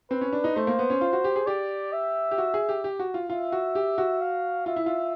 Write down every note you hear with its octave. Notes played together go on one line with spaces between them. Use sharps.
C4 B4
C#4
D4
D#4
A3 C5
A#3
B3
C#4
F4
F#4
G4
G#4
G4 D5
E5
G4
F#4
G#4
G4
G4
F#4
F4
F4 E5
F#4
G4
F#4
F5
F4 E5
E4
F4